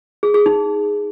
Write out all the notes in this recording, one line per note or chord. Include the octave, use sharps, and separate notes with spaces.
G#4
G#4
D#4